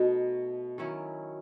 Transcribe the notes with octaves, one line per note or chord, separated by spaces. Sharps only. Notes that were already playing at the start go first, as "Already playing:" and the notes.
Already playing: B2 A3 D#4 F#4
D#3 F#3 C#4 E4